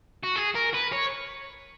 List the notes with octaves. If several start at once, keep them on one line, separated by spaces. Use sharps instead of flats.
F#4
G#4
A#4
B4
C#5